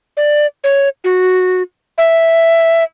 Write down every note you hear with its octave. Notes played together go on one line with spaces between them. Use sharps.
D5
C#5
F#4
E5